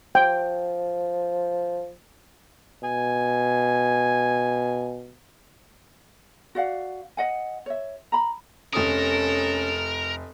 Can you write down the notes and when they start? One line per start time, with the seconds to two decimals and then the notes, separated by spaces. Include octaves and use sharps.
0.15 F3 G5
2.84 B2 G#5
6.55 F#4 D5 F5 F#5
7.17 D#5 F#5 G#5
7.66 C#5 E5
8.12 A#5 B5
8.73 F1 C#4 A4 A#4 D#6